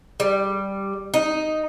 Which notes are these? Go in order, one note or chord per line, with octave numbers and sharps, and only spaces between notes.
G3
D#4